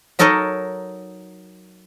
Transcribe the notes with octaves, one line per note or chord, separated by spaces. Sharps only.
F#3 D#4 A4 A#4 C#5 D#5